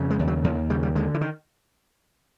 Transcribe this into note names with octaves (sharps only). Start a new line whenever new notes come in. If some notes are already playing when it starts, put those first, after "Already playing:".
Already playing: F2 C#3
G#3
D#2
F#3
D#2 F3
C#3 G3
G3
D3 G#3
E3
D#3